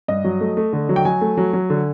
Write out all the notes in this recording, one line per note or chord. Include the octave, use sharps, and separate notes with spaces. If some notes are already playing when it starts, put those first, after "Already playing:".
G2 D#5
F#3
A3
A3
D3
F#3
G5
F#3 G#5
A3
F#3
F#3
D3